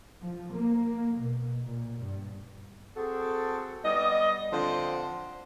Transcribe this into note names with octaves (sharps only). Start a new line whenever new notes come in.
F3
A#3
B2
A#2
G2
C4 F#4 G#4 A4
G3 B3 D#5
D3 F3 C4 F4 C5